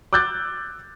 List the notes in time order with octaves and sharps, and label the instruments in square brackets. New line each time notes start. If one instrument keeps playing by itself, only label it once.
[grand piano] D6 E6 F#6 G6 A6